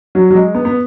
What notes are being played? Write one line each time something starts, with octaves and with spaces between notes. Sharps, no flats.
F#3
F#3
G#3
B3
B3